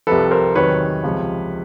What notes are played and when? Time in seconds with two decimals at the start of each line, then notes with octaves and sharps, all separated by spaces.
0.07 C2 C3 F3 A4 B4
0.31 A#4 C5
0.55 E2 C3 D#3 F#3 B4 C#5
1.03 C#2 C3 F3